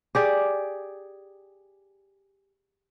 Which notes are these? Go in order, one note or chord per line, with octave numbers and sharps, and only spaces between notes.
G4 G#4 D5